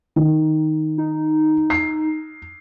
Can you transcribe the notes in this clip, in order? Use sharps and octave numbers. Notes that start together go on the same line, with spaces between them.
D#3
D#4
C7